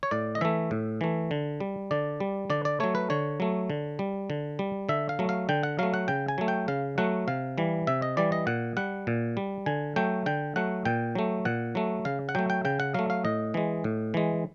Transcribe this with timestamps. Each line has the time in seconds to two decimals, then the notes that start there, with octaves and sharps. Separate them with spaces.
0.03 C#5
0.11 A2 D5
0.35 D#5
0.41 E3 A3 E5
0.71 A2
1.01 E3 A3
1.31 D3
1.60 G3
1.91 D3 D5
2.20 G3
2.50 D3 D5
2.65 D5
2.80 F#3 A3 C#5
2.95 B4
3.10 D3 C#5
3.40 F#3 A3
3.70 D3
3.99 G3
4.30 D3
4.59 G3
4.89 D3 E5
5.09 F5
5.19 F#3 A3
5.29 F5
5.49 D3 G5
5.63 F#5
5.79 F#3 A3 F5
5.94 F#5
6.08 C#3 G5
6.28 G#5
6.38 F#3 A3
6.48 G5
6.68 C#3 F5
6.98 F#3 A3 F#5
7.28 C3 F5
7.58 E3 G3
7.87 C3 E5
8.02 D#5
8.17 E3 G3 D5
8.32 D#5
8.47 A#2 F#5
8.77 G3 F#5
9.07 A#2
9.37 G3
9.66 D3 G#5
9.96 F#3 A3 G5
10.26 D3 G5
10.56 F#3 A3 F#5
10.85 A#2 G5
11.15 F#3 A3
11.45 A#2 F#5
11.75 F#3 A3
12.05 C#3 F5
12.29 F#5
12.35 F#3 A3 G5
12.50 G5
12.65 C#3 G5
12.80 F#5
12.94 F#3 A3 F5
13.10 F5
13.25 A2 D#5
13.54 E3 G#3
13.84 A2
14.14 E3 G#3